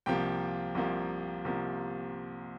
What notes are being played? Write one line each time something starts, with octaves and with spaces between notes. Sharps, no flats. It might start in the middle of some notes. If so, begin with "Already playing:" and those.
C2 C3 F3 A#3 G4 G5
C2 C3 F3 A#3
C2 C3 F3 A#3